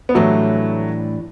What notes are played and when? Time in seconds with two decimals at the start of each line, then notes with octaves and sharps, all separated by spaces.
0.09 B3
0.15 A2 E3 F#3 G3 A3 D4